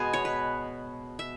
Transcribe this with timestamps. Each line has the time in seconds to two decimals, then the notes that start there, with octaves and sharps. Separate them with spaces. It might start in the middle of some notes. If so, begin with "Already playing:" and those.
Already playing: B2 G#3 B3 G#5
0.13 C#5
0.25 B4
1.19 E5